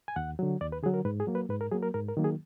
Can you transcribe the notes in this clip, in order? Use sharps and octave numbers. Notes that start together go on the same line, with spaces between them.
G#5
D#2 F#5
D3 F#3
D#2 D5
B4
D3 F#3 G#4
A#4
G#2 B4
G#4
F#3 A#3
B4
G#2 B4
A#4
F#3 A#3 G#4
A#4
G#2 A#4
A#4
D#3 F#3 A#3
G#4